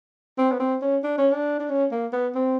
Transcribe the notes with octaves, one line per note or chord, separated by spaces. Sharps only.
C4
B3
C4
C#4
D4
C#4
D4
D4
C#4
A#3
B3
C4